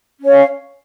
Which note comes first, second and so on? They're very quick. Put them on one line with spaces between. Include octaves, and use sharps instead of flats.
C#4 C#5 F5